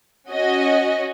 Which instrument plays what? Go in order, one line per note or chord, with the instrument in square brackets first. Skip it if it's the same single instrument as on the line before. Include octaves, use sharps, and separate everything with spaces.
[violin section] C#4 F#4 D#5